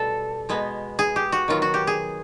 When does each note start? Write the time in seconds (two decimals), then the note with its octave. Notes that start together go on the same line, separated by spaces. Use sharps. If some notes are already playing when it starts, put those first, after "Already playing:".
Already playing: B2 G3 A4
0.49 B2 G#3 B3
0.99 G#4
1.16 G4
1.32 F#4
1.48 D#3 F#3 B3 F4
1.62 F#4
1.74 G4
1.87 G#4